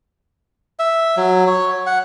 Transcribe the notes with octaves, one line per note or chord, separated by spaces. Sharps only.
E5
F#3
C#5
F#5